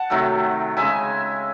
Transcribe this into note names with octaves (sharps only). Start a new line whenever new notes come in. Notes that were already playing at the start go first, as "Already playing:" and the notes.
Already playing: F#5 A5
C3 D#3 F#3 A3
C#3 G#3 E5 G#5